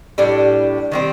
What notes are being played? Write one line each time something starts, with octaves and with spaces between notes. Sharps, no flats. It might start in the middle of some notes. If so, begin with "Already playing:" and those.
A2 G3 D4
D#3 G3 C4